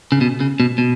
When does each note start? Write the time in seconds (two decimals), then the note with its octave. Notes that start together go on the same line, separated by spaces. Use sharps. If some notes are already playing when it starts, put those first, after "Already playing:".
0.12 C#3
0.21 B2
0.40 C#3
0.60 B2
0.78 B2